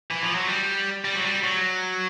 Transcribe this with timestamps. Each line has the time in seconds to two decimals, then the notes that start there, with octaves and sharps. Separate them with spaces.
0.11 E3
0.23 F3
0.35 F#3
0.48 G3
1.04 G3
1.16 F#3
1.25 G3
1.44 F#3